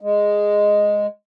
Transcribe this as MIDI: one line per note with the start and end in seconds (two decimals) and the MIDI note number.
0.01 1.07 56